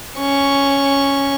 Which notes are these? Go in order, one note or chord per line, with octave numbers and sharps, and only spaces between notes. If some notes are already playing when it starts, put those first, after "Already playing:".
C#4 C#6